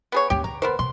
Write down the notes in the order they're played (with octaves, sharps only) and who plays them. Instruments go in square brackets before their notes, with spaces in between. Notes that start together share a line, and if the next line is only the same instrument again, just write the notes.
[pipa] B3 G#4 C#5
[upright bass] D#2 C#4 [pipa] G4
[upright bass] D3 [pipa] A#5
[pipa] B3 A#4 C5
[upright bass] C3 [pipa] C6